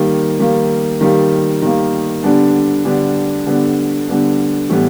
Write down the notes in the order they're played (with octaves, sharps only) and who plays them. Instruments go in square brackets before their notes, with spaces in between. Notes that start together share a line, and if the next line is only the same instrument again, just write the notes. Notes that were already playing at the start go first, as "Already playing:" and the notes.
Already playing: [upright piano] D#3 G3 A#3
D#3 G3 A#3
D#3 G3 A#3
D#3 G3 A#3
D3 G3 B3 D4
D3 G3 B3 D4
D3 G3 B3 D4
D3 G3 B3 D4
A2 E3 G3 B3